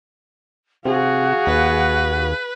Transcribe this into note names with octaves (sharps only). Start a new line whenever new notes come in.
C3 F#4 G#4 F5
D#2 B4